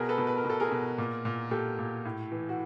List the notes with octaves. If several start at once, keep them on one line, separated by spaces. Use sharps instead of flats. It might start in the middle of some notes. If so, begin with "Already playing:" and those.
Already playing: B2 G#4 A#4
A4 B4
B2
B4
A#4
B2
A4
G#4 A#4
B2
A#2
A#2
A#2 G4 A4
A#2
A2
E3
F#4